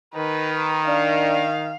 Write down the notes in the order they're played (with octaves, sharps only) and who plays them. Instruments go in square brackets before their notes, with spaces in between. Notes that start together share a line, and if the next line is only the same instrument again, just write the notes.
[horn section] D#3 [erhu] B4
[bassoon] D4 [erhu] F5